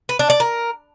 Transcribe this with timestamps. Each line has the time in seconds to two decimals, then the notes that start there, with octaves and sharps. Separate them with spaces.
0.09 B4
0.19 D4
0.30 D5
0.40 A#4